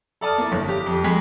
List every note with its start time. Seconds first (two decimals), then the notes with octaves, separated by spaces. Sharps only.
0.21 A4 D5 A5 D#6 F6
0.38 A#3 E4
0.51 G1 C#5
0.69 G4
0.86 F2
1.04 F2 G#3 G#5 B6